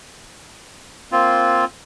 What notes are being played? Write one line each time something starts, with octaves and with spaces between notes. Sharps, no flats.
A#3 C4 F4